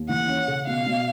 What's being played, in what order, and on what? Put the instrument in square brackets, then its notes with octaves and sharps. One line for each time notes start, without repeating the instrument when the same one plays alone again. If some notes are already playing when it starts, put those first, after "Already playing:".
Already playing: [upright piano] D#2
[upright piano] E3 [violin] F#5
[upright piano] C#4
C#3
[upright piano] B2 [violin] F5
[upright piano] B2